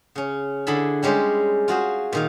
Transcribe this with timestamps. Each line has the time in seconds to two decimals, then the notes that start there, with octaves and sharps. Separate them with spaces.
0.15 C#3 C#4
0.67 D3 E4 G#4 A5 B5
1.03 G3 G#3 C#4 G4 G#4 C5
1.68 F4 F#4 G#4 C5
2.13 A#2 D#3 F5